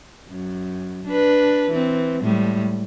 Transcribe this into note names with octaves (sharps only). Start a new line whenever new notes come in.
F#2
D4 B4
E3 C4
A2 G3 G#3